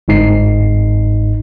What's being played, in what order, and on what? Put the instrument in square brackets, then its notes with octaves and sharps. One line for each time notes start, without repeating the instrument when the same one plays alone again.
[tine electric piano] G1 G#2 D#4 C7